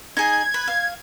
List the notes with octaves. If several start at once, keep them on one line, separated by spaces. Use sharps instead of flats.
D#4 G#4 G#6
B4
F5